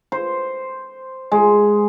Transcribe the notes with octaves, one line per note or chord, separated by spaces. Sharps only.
C5
G#3